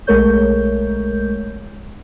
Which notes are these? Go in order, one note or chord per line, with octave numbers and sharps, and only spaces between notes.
B1 G#3 A3 A#4 C#5 G6